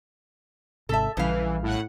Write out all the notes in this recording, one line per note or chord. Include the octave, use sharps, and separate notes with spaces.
G#1 G#2 C3 A4 E5
A#1 C#3 E3 G3 F5
A2 F#5